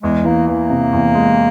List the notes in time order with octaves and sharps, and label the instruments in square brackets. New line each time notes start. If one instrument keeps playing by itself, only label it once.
[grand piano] E2 [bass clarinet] G#3
[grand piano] E3 [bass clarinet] A#3
[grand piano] E3 [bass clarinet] A#3
[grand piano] C3
E2
G#3